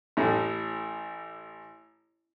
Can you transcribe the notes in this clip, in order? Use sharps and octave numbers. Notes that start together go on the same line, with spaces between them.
A1 A2